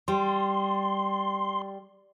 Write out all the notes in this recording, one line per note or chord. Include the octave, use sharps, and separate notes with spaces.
G3 C6